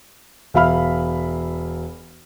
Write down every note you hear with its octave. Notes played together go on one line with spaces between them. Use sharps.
E1 E5 F5 B5 F6